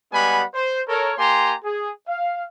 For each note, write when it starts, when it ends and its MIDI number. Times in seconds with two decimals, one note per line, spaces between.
0.13 0.43 55
0.13 0.43 56
0.13 0.43 59
0.13 0.43 78
0.13 0.43 80
0.13 0.43 83
0.54 0.81 72
0.88 1.13 69
0.88 1.13 70
0.88 1.13 73
1.18 1.55 58
1.18 1.55 67
1.18 1.55 80
1.18 1.55 82
1.18 1.55 84
1.64 1.91 68
2.08 2.45 77